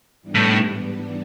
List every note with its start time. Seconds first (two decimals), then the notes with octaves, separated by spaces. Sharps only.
0.22 G#2 E3 G3 B3 D4
0.35 A2